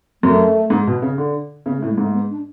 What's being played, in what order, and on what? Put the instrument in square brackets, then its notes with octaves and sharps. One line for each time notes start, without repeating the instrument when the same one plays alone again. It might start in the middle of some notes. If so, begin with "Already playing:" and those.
[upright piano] F#2 [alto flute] A3
[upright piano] G#2
B2
C#3
D3
[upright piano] C#3 [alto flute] B3
[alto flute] A3
[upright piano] A2
[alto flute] G#3
[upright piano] G#2 [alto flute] A3
[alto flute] B3
D4